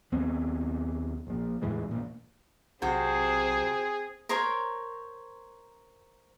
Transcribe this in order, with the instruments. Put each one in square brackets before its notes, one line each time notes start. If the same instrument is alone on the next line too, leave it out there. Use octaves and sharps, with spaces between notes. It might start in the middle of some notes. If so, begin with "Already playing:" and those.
[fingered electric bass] D#2 B3 C4
A#1 A#2
E2 A2 E3 G#3
A1 A#2
[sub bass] B1 [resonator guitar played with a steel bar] C3 F#4 [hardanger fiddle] C4 [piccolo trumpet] G#4
[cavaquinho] A#4 C5 C#5 C6